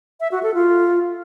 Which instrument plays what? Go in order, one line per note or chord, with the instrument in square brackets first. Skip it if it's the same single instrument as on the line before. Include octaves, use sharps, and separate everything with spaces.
[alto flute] E5
F#4
A4
F4